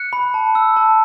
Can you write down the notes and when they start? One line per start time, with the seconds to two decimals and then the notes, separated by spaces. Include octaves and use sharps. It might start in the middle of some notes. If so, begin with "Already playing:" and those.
Already playing: F#6 C#7
0.13 B5
0.34 A5
0.55 E6
0.76 A5